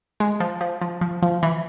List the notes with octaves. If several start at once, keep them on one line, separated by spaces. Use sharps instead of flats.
G#3
F3
F3
F3
F3
F3
E3